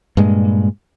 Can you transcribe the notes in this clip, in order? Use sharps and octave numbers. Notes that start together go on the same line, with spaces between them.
G2 A#2 G#3